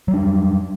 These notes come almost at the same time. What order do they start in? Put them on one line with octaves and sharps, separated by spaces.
F#3 G3 D4